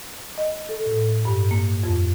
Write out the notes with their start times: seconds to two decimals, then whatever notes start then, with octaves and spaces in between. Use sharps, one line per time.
0.38 D#5
0.69 A4
0.86 A2
1.25 G2
1.51 A#3
1.83 F2